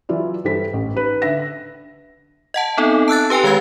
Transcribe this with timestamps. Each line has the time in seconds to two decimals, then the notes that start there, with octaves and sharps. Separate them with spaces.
0.09 E3 F#3 E4 F4 D5
0.44 G2 E3 G3 A4 C5 B6
0.73 A1
0.94 D#4 B4
1.22 D3 E5 A#6
2.54 D#5 F#5 A5
2.77 B3 C4 D#4 A4
3.08 A5 E6 F#6 A6
3.30 G4 B4 G5 G#5 C6
3.44 D#3 G#3 B4 F5 G#6